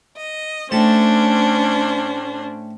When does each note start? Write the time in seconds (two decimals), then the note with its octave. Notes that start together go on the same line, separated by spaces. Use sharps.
0.18 D#5
0.71 A2 C#4 D4 C5 A5